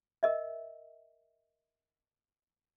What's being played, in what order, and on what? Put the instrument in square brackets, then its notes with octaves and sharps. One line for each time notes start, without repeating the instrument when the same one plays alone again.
[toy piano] A#4 D#5 E5